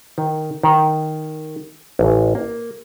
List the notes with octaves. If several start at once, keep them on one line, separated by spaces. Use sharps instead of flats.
D#3
D#3
A1
A#3